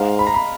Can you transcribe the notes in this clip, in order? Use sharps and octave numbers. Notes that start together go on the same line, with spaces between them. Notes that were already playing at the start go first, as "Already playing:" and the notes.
Already playing: G#2 F5
B5
A#5
B5